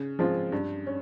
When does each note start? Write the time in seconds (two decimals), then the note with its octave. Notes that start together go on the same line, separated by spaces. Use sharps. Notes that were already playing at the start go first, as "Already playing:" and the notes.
Already playing: C#3
0.19 F3 G#3 C4 F4
0.52 G2
0.87 C#4